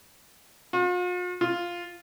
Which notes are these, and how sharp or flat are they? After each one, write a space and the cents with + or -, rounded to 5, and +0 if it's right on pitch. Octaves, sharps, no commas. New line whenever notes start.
F4 +45
F4 +0